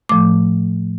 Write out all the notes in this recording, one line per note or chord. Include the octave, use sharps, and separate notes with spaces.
A2 F3 A3 D6